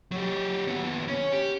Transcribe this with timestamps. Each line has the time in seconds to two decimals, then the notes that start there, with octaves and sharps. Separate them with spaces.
0.12 F#3 G4
0.67 D#2 B3
1.08 C#4
1.33 G4